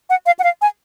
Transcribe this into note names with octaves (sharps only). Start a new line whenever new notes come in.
F#5
F5
F#5
F5
G#5